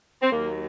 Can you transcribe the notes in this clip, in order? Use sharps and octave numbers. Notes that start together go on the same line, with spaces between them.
C4
D#2 D#3 F#3 A#3